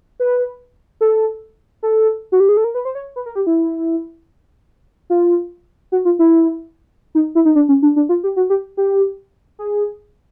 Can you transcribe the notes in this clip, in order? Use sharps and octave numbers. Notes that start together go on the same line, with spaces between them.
B4
A4
A4
F#4
G4
G#4
A4
A#4
B4
C5
C#5
B4
A#4
G4
E4
F4
F#4
F4
E4
D#4
E4
D#4
D4
C#4
D4
D4
F4
G4
F#4
G4
G4
G#4